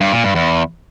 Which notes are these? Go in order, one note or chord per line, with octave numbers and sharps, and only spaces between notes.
G2
A#2
G2
E2